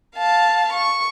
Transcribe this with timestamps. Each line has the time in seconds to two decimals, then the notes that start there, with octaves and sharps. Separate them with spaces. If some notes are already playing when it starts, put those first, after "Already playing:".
0.17 F5 A5
0.73 C#6